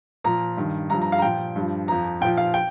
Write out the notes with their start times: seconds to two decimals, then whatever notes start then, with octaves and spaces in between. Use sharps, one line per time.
0.24 A#2 F3 A#5
0.57 G2 D#3
0.90 G2 F3 A#5
1.01 A#5
1.12 F5
1.18 A#5
1.22 A#2 F3 G5
1.56 G2 F3
1.88 F2 F3 A#5
2.21 A#2 G5
2.25 F3
2.37 F5
2.54 G5